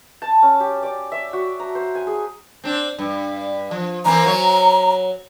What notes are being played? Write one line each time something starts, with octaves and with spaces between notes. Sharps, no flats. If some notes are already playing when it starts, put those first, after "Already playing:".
A5
C#4
G4
D5
E5
F#4
A#5
C5
G#5
G#4
C4 D4
G2
F3
E3 A#3 C4 A#5
F#3 C#5